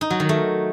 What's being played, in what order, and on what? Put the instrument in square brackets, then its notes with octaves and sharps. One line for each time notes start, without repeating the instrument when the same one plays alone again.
[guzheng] D#4
F#3
D#3
A3